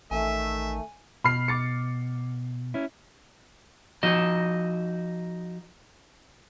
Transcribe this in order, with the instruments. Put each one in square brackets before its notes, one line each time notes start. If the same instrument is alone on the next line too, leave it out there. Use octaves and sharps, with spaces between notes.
[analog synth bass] A1 [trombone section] D#3 A3 [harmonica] E5 [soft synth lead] G#5
[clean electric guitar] B2 [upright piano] B5 F6 C7
[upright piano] D6 A6 C#7
[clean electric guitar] C#4 E4
[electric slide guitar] F3 D#4 F#4 D#5